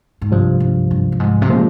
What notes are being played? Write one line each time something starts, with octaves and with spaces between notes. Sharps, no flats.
G#2
C2 G2 C3 F3
G2
G2
G2
G#2
C3
A#2 C#3 F3 G#3 C#4